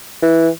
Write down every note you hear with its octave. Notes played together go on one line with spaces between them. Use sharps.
E3